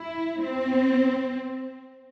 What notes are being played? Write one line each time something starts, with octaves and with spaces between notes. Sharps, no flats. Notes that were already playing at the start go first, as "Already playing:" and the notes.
Already playing: E4
C4